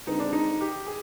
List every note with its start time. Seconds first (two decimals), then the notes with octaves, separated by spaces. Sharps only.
0.07 D3 G#3 C4 D#4
0.20 D4
0.33 D#4
0.61 G4
0.87 G#4